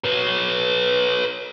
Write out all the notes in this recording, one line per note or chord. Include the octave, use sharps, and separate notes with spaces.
B4 C#5